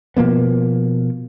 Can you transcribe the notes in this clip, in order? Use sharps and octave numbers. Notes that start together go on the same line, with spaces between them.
B2 F3 A#3 B3